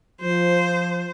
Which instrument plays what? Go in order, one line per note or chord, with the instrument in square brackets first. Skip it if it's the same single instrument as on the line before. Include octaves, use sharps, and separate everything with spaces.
[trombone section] F3 [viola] C5